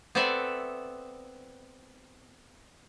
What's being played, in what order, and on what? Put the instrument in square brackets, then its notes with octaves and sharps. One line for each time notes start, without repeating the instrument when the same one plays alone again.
[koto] B3 C4 A4 B4 D5 E5